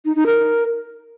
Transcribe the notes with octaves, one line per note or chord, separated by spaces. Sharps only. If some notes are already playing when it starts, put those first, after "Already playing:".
D#4
D#4
A#4